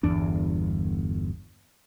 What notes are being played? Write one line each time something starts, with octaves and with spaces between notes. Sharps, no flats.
G1 E2 D4